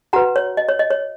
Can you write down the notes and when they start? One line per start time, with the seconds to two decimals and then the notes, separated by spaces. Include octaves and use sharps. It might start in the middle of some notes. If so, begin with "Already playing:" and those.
0.13 F#4 B4 F#5 A#5
0.36 C#5
0.57 D#5
0.68 C#5
0.79 D#5
0.91 C#5